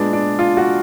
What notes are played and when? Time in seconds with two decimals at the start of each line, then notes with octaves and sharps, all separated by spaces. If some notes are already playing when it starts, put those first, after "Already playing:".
Already playing: A#2 G#3 B3 D4
0.13 D4
0.39 F4
0.57 F#4